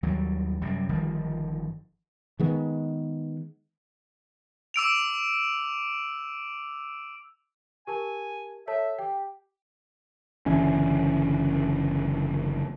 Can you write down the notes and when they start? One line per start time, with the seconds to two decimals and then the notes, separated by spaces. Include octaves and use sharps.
0.03 D#2 F#3 G3
0.62 F#2 C3 G3
0.89 G1 D#3 F3 G3
2.39 D#3 G#3 B3
4.74 D6 E6 D7 F7
7.87 G4 A#4 G#5 A5
8.68 A4 C#5 E5 A5
8.99 G4 G5
10.46 F#1 D3 E3 C#4